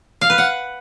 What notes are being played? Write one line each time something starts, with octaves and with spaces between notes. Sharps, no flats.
F5
B4
F#5